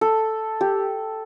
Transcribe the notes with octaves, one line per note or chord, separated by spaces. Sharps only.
A4
G4